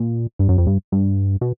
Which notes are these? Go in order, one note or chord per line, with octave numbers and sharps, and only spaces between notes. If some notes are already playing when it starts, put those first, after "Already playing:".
Already playing: A#2
G2
F#2
F2
G2
G2
B2